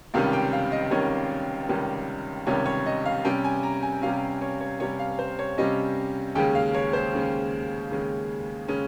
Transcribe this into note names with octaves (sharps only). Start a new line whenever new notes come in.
C#2 C3 D#3 G3 C#4 F5
G5
F5
D#5
C#2 C3 D#3 G3 C#4 C#5
C#2 C3 D#3 G3 C#4
C#2 C3 D#3 G3 C#4 C#5
C#5
D#5
F5
C3 G3 C#4 G5
G#5
A#5
G#5
C3 G3 C#4 F5
C#5
C#5
C3 G3 C#4 C#5
F5
C5
C#5
C3 G3 C#4 D#5
D#2 C#3 G#3 C#4 G5
F5
C#5
C5
D#2 C#3 G#3 C#4
D#2 C#3 G#3 C#4
C#3 G#3 C#4